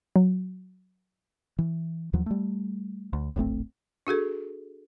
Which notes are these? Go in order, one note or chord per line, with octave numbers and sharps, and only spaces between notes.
F#3
E3
D#2 F3 F#3
G3 A3
D2
D1 G#1 A3 C4
D4 F#4 G#4 A4